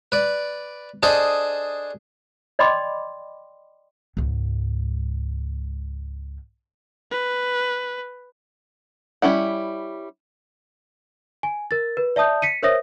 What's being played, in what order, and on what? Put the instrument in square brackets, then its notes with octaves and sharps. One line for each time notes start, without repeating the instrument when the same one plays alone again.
[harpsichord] B4 D5
D4 G#4 A4 C5 D#5
[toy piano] D5 D#5 G5 B5 C6 D6
[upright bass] C#2 G#2
[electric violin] B4
[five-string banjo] G3 C#4 E4 F#5
[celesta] G#5
A#4 A6
B4
D5 E5 A5 D#6 G6
B6 C#7 D#7
A#4 C5 C#5 E5 D#6 A#6